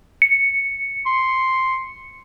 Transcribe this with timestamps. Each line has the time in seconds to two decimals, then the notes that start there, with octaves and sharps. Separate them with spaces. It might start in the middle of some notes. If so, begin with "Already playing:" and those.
0.22 C#7
1.06 C6